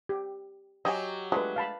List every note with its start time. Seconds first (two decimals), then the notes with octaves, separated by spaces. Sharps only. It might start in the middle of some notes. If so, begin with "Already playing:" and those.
0.09 G4
0.85 F#3 G4 D#5 G#5 D#6
1.32 G#3 A3 D4 F4 B4
1.56 F5 A5 B5